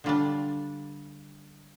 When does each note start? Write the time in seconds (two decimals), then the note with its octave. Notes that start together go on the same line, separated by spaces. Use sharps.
0.04 D3 G3 D4 F4